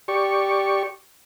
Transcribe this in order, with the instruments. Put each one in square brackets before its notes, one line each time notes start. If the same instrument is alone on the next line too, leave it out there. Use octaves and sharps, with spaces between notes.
[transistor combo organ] G4 D5 C#6